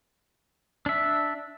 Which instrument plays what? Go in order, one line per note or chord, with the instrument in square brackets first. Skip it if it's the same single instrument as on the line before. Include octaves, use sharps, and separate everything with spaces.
[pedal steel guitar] D4 E5